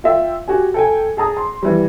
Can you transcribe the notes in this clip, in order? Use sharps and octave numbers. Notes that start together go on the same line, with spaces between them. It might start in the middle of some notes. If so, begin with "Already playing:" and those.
F4 E5 G5
F#4 G4 G#5
A4 G5 G#5
G#4 A5 A#5 D#6
C6
E3 G3